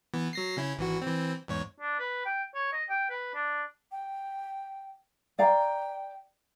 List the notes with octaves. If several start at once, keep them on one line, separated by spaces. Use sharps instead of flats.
E3 B3
F#3 A#6 C7
C#3 C#4 E4
G#1 E3 F#4
E3 C4
E2 G#2 C#5
D4
B4
G5
C#5
D#5
G5
B4
D4
G5
D5 F5 G5 A#5